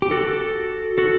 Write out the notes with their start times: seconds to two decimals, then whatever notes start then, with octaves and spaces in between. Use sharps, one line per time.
0.02 G4
0.11 F#4 A4
0.98 F#4 A4